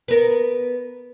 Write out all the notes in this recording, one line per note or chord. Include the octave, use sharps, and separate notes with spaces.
B3 A#4